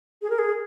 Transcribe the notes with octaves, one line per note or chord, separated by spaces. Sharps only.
G#4
A#4
G#4